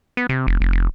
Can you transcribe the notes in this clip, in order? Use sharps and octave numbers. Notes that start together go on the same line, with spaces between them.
B3
C3
F1
F1
F1